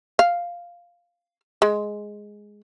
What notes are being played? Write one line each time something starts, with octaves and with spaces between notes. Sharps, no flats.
F5
G#3